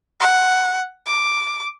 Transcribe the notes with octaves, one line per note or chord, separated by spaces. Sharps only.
F#5
D6